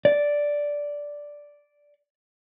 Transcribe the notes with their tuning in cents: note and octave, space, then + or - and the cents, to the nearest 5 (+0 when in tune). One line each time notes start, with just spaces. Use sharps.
D5 -5